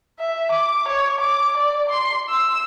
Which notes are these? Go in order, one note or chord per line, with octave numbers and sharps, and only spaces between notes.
E5
D6
C#5
D6
D5
C6
E6